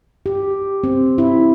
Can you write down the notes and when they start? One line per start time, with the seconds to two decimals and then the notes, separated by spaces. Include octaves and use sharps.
0.26 G4
0.84 C4
1.18 E4